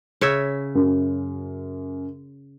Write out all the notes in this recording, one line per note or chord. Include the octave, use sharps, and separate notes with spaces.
C#3 C#5 E5
F#2